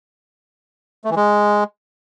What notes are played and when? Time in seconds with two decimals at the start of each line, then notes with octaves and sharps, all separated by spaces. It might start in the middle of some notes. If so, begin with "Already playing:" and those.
1.05 A3
1.10 E3
1.16 G#3